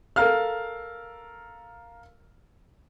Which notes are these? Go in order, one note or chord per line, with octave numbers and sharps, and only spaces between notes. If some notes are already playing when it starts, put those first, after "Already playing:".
A4 A#4 F5 F6